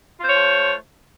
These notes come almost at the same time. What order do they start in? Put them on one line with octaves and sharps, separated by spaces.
F4 C5 C#5 A3